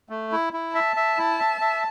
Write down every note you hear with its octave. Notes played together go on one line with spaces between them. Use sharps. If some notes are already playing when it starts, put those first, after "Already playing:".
A3
E4
E4
E5 A5
E5
E4
E5
E5